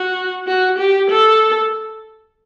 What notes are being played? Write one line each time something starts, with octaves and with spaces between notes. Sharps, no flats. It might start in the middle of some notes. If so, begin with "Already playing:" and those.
Already playing: F#4
F#4
G4
A4